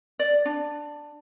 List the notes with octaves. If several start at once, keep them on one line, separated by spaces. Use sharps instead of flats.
D5
D4